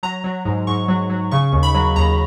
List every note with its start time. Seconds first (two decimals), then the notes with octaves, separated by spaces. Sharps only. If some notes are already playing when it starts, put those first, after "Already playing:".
0.03 F#3 A#5
0.24 F#3
0.45 G#2
0.67 G#2 C#6
0.88 F#3
1.10 F#3
1.31 C#3 C#6
1.52 D#2
1.63 B5
1.74 F#3
1.96 D#2 A#5